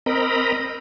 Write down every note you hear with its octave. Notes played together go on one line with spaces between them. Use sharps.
C4 A#4 D#5 A#5 B5